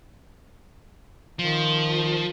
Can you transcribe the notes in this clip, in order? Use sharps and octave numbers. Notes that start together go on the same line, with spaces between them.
D#3 F3